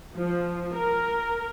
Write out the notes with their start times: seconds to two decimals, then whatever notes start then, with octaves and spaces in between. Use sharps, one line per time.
0.16 F3
0.73 A#4